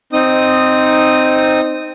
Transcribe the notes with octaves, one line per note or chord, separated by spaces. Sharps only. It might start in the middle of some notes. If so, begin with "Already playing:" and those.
C4 D#4 D#6